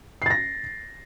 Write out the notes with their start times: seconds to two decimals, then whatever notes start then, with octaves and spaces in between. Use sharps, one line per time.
0.22 C7
0.26 A6
0.30 A#6